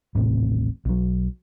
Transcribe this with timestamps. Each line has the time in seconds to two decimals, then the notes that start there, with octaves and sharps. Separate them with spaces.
0.15 D#1 A1 A2 C3
0.85 B1 F#3